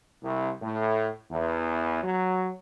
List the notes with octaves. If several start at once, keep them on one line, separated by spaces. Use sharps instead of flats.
C2
A2
E2
F#3